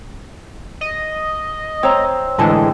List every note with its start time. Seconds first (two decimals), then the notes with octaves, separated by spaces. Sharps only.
0.81 D#5
1.83 C4 C#5 A#5
2.38 A2 D3 E3 G#3 A4 D#5 A5